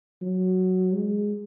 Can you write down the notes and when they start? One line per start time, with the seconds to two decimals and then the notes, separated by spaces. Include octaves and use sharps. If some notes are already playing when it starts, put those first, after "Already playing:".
0.22 F#3
0.94 G#3